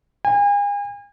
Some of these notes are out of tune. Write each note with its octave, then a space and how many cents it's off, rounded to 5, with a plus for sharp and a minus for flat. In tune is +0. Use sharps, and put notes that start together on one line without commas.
G#5 -40